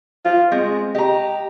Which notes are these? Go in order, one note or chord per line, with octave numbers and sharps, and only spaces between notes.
F4
G#3 C4
G4 D#5 A#5